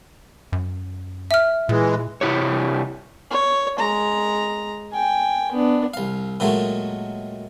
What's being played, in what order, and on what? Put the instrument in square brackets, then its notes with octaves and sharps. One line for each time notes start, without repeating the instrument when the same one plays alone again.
[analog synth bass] F#2
[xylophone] E5 F6
[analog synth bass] A#2 [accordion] E3 G#3
[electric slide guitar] C3 E4 G4 C#5
[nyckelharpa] C#5
G#3 A#5
G5 G#5
B3 D4
[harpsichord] C2 F5
A#2 D#3 F#3 G#3 A3